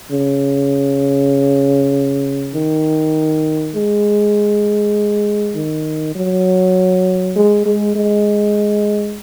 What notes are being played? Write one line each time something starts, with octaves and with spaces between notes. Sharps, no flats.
C#3
D#3
G#3
D#3
F#3
G#3
G#3
G#3